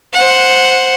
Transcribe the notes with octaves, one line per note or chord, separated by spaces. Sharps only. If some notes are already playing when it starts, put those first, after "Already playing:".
C5 F#5